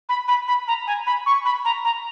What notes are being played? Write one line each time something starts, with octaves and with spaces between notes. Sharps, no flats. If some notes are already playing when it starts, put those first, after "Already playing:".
B5
B5
B5
A#5
G#5
B5
C#6
B5
A#5
A#5